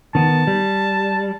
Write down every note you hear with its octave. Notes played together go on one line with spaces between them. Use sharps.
D#3 B3 A5
G3